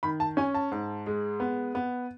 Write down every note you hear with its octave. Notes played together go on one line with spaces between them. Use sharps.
D#3 B5
A5
C#4 G#5
A5
G#2
G#3
B3
B3